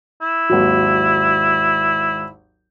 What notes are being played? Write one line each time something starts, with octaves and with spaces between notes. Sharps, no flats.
E4
G#1 D#2 F#3